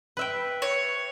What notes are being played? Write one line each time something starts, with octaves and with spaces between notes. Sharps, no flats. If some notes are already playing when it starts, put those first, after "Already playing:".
B4 E5 G5
C#5